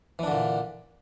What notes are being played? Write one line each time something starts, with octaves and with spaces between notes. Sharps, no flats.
A#2 D3 E3 D4